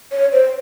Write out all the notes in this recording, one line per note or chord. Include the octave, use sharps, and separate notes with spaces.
C#5
C5